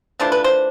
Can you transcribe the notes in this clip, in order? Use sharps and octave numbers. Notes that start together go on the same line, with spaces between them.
E3 A3 D4 F4 C5
B4
C5